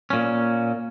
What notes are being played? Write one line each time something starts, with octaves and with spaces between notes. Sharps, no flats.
A#2 C#4